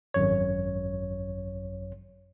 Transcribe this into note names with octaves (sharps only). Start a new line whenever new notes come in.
G#1 F#2 C#5